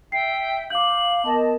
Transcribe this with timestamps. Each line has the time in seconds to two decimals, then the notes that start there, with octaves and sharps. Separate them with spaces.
0.12 E5 G5 C7
0.70 F5 D6 G6 F#7
1.24 B3 A#4 D#5 A5